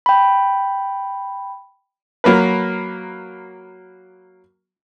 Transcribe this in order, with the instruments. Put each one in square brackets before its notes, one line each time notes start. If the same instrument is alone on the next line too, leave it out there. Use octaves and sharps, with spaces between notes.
[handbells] G5 B5
[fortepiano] F#3 A#3 A#4 B4